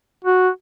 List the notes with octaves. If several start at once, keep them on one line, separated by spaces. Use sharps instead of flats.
F#4